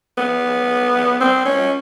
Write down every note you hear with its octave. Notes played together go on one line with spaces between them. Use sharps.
B3
C4
C#4